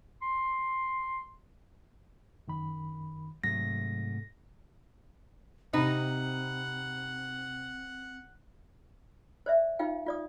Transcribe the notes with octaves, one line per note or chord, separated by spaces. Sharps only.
C6
F#2 D#3 B5
G#2 C3 F#3 A3 A#6
C3 C4 D#4 F#5 B5
C5 D5 E5
D#4 F4 F5 G5
F4 D5 D#6